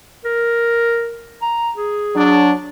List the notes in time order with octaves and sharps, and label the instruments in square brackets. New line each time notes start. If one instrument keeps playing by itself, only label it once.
[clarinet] A#4
A#5
G#4
[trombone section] F#3 D4